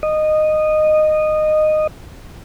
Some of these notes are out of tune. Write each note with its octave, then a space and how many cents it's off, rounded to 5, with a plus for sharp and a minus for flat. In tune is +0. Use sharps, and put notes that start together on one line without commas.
D#5 -15